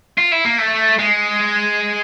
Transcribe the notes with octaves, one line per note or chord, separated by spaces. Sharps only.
F4
E4
A#3
A3
G#3